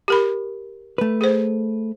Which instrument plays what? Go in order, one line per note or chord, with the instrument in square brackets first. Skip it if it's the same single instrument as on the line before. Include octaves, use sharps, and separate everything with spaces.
[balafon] G4 A#4 B5
[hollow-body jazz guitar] A3 B4
[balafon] G#4 C5